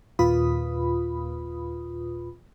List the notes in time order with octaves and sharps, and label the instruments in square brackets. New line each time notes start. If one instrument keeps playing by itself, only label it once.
[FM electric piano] D#2 A#2 F4 B4 B5 D#6